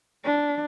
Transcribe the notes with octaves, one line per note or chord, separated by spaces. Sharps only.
D4